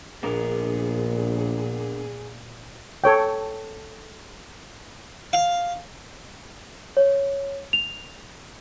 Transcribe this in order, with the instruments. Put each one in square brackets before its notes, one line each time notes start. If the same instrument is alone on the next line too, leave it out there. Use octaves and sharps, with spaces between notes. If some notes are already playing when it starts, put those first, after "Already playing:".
[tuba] A#1 [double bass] A#2 [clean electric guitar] B3 D4 A#4 [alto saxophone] G#4
[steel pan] A4 C#5 G5
[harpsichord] F5
[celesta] C#5
F7